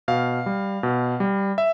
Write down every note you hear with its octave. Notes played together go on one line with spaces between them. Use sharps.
B2 F5
G3
B2
G3
E5